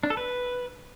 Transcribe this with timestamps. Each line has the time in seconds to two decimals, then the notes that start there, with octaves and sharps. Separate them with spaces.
0.03 D4
0.10 A4
0.17 B4